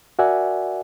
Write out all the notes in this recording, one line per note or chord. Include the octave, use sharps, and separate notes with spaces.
F#4 A#4 D5 E5 F#5 G#5